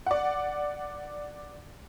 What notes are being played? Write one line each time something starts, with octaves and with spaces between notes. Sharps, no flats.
D5 F#5